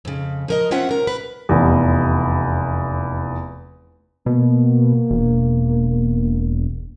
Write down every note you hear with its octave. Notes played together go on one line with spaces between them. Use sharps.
F2 C#3
F3 A#4 D#5
C4 C#4 F4 E5 F#5
C3 A#4
B4
F1 E2
B2 A#3
E1